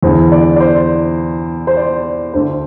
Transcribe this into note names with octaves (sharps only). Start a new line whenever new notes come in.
E2 D3 C5
D5
D5
C5
C5
D5
D2 D3 C5